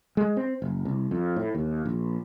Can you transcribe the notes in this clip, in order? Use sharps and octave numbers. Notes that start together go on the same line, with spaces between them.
G#3
C4
F#1
C2
F2
A2
D#2
A#1